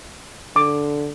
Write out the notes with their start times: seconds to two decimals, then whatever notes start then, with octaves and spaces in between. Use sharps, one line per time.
0.56 D3 D6